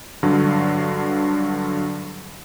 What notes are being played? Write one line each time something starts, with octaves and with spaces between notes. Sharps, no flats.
G2 D3 F#3